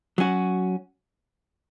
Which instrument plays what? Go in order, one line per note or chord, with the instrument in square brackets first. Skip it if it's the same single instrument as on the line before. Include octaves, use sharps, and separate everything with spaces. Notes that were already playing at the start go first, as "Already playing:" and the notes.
[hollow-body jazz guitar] F#3 C#4 F#4